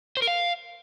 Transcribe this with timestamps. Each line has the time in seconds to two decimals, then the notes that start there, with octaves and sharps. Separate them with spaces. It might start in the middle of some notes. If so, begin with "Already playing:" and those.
0.17 C5
0.22 A#4
0.27 F5